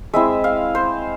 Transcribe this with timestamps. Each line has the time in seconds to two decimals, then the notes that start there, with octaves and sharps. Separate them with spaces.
0.13 G#3 C4 E4 E5
0.44 F5
0.75 C5